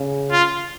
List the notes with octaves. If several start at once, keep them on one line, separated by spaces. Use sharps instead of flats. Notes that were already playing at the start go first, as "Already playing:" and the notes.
Already playing: C#3
F4